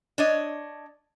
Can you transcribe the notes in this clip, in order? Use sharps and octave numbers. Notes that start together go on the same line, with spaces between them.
D4 C#5 D#5